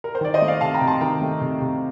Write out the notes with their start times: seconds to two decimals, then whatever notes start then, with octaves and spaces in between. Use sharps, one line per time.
0.04 A#4
0.15 C5
0.21 D#3 D5
0.34 C5 D#5
0.42 A3
0.48 D5 F5
0.61 C3 F5 A5
0.74 G5 A#5
0.81 C3
0.87 A5 C6
1.01 D#3 G5 A#5
1.21 A3
1.41 C3
1.61 C3